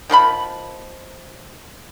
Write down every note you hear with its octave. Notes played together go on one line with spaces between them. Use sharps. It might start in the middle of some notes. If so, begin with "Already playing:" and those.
D#3 F3 D4 B5